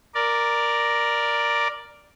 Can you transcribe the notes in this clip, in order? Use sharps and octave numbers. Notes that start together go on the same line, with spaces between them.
A#4 D5